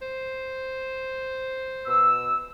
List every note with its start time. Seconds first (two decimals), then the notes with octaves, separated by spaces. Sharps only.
0.02 C5
1.86 B2 E6